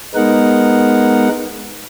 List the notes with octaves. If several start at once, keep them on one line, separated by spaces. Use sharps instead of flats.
G#3 B3 D#4 A#4 F#5